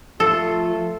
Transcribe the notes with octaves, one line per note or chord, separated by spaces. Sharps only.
F3 A3 F4 A4